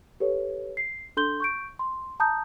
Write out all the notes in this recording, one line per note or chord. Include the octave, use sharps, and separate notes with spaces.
G4 A4 B4 C#5
C7
D4 A4 C6 G6 G7
C#6 G6 D7
C6
A5 A#5 D#6 G6